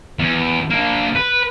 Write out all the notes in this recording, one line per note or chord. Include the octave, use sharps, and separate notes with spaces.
E2
A#3 D4
B4